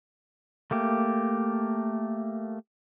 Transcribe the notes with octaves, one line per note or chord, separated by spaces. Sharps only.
A3 A#3 G4